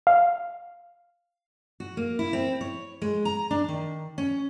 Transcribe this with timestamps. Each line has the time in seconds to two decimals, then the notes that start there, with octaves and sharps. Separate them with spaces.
0.07 F5
1.80 F#4
1.97 A#3
2.19 E4
2.33 C4
2.61 C#5
3.02 G#3
3.25 A#5
3.51 D4
3.68 D#3
4.18 C#4